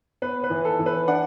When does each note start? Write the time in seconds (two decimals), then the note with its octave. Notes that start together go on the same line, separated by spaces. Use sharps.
0.22 B3 B4
0.44 B4
0.50 E3
0.65 A4
0.79 E3
0.86 B4
1.08 D4 D5 F#5